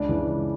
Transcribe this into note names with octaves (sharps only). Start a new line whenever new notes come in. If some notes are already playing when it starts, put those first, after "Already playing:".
Already playing: C#2 D4 D5
C#3 E3
C#2